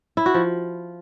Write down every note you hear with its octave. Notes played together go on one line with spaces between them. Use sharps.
E4
F#4
F3